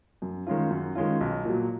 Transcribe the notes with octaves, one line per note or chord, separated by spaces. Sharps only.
F#2
D#3 G#3 C#4 F4
F#2
D#3 G#3 C#4 F4
B1
A#2 F#3